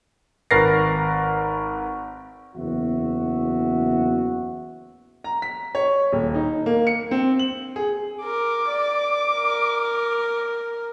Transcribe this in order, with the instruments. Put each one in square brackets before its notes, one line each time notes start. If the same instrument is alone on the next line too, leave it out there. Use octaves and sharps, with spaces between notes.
[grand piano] G#1 A#4 B4 A6 A#6 C7
[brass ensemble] F#1 E2 F#4 E5 F#5
[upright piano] A#5
B6
C#5
D#1
D#4
A#3
C#7
C4
F#7
G#4
[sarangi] A#4 [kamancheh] D6
[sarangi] D5
A#4